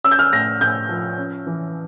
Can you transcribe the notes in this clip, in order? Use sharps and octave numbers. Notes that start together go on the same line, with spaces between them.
C#4 E6
G6
F6
A2 A#6
A2 G6
F3
C#4
E3